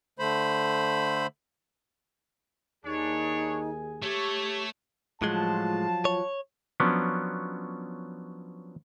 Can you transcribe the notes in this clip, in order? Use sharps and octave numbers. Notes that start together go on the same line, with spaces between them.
D3 A3 C5 B5
D#2 D4 D#4 G#4 C#5 G#5
A3 G4 A4 C#5
A2 F3 F#3 G#3 F4 F#5 A5
C#5
F3 F#3 B3 C#4 D4